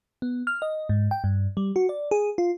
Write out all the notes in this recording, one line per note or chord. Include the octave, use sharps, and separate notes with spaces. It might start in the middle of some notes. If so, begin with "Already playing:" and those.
B3
F6
D#5
G#2
G5
G2
G3
F#4
D5
G#4
F4